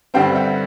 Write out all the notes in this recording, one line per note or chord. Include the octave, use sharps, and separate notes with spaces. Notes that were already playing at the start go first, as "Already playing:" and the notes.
G2 D3 G3 C4 F5 G5
E5 F#5